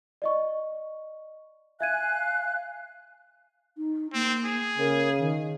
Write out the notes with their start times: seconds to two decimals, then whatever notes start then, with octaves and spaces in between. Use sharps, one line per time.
0.22 D5 D#5 C#6
1.80 E5 F5 G#5 F#6 G#6 D#7
3.77 D#4
4.13 A#3 C4
4.45 G#4
4.78 C#3 A#4
5.17 D#3